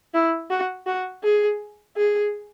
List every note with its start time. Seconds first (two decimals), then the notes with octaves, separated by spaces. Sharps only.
0.14 E4
0.51 F#4
0.87 F#4
1.23 G#4
1.97 G#4